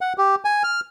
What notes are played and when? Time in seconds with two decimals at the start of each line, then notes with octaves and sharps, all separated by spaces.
0.01 F#5
0.18 G4
0.45 G#5
0.64 F6